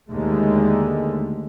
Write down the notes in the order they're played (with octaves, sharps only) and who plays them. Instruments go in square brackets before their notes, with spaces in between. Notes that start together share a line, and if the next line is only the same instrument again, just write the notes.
[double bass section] D#2 D3 G#3 A3